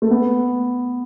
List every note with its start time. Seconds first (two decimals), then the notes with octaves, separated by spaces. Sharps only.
0.02 A3
0.11 B3